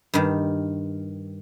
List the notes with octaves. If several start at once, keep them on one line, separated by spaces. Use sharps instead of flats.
G2 D#3